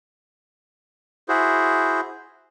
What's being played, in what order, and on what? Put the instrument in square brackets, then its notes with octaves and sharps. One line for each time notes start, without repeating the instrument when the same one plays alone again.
[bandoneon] E4 F#4 G#4 C5